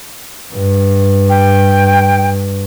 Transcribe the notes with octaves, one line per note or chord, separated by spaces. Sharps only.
G2
G5